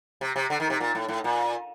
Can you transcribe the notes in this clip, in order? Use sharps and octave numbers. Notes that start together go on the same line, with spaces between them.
C3
C3
D3
D#3
C3
A#2
A2
A2
A#2